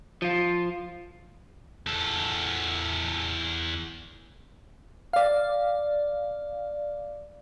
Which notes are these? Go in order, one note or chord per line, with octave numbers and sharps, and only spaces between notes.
F3 F4
E2 A4
D5 F5